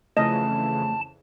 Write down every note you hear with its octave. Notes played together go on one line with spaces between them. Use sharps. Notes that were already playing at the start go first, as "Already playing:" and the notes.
F2 C#3 E3 A3 D#5 A5